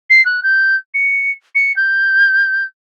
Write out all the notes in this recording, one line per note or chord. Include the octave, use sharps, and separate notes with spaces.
C7
F#6
G6
C#7
C#7
G6